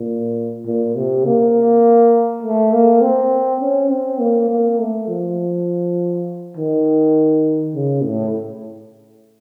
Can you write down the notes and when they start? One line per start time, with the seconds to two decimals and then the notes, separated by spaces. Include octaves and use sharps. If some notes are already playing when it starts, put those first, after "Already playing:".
Already playing: A#2
0.66 A#2
0.96 C3
1.25 A#3
2.43 A3
2.73 A#3
3.02 C4
3.61 C#4
3.91 C4
4.20 A#3
4.49 A#3
4.79 A3
5.08 F3
6.57 D#3
7.74 C#3
8.03 A2